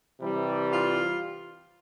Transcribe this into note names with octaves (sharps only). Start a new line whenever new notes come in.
C3 E3 G3
F4